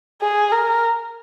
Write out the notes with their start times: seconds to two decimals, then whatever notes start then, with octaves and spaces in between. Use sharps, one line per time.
0.22 G#4
0.52 A#4